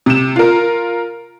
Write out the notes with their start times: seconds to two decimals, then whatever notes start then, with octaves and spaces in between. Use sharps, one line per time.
0.06 C3 E7
0.36 F4 A#4